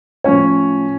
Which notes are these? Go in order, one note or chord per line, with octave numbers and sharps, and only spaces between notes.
A2 F3 C#4 C#5